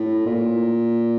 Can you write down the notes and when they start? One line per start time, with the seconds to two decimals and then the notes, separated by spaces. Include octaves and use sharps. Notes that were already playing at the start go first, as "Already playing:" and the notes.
Already playing: A2
0.26 A#2